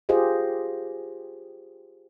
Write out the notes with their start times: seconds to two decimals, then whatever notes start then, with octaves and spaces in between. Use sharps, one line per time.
0.09 F4 G4 G#4 C5 D#5